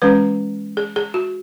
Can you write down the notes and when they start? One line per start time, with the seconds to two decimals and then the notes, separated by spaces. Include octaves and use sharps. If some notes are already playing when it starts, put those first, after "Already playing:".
0.02 E3 G#3 C#4 B4
0.77 G#4
0.96 G#4
1.14 F#4